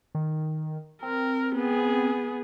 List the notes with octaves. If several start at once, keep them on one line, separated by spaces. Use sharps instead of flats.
D#3
C4 A#4
B3 G#4